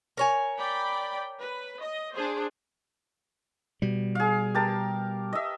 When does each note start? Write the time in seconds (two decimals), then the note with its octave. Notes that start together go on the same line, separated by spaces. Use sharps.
0.17 A#4 C#5 G#5
0.58 D5 G5 B5
1.40 B4
1.80 D#5
2.14 D4 G#4 C5
3.82 B2 G3
4.15 G#4 F5
4.55 G4 A#4 A5
5.33 D#5 E5